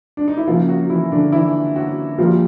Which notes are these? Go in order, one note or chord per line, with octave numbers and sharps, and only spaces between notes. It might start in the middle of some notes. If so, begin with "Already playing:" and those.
D4
D#4
E4
C#3 F3 F#3 A#3 F4
F#3 F#4
E3 E4
D3 D4
E3 E4
F#3 F#4
A#2 F3 G3 A#3 F4